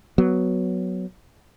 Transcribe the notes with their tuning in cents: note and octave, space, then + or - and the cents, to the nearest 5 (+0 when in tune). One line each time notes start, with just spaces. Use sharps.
F#3 +0 B3 +0